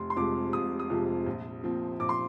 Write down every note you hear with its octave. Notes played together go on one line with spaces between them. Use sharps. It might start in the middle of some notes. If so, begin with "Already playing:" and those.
Already playing: F1 C6
C6
F2 C3 F3 G#3 D6
F1 D#6
D#6
F2 C3 F3 G#3
A#1
A#2 F3 C4
A#1 D6
C6